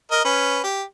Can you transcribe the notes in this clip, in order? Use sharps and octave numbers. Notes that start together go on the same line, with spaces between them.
A#4 D#5
C#4 B4
G4